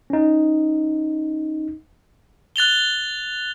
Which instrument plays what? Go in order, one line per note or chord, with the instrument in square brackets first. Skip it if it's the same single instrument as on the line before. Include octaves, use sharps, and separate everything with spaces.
[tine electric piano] C#4 D#4
[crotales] F#6 A6 F7 G7